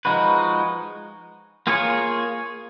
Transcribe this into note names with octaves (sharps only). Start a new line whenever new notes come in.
F3 G#3 D#4 F#4 B4
A#3 F4 G#4 C#5